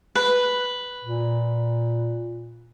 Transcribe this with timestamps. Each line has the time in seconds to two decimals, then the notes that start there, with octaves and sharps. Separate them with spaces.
0.15 B4
1.04 A#2